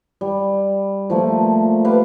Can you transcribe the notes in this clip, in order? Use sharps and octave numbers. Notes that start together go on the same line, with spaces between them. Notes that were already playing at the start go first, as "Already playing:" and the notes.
G3
F3 A3 A#3
G4 B4 F5